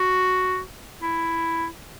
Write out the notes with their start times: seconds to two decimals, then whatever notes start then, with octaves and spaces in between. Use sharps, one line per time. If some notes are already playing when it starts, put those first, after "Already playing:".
Already playing: F#4
1.02 E4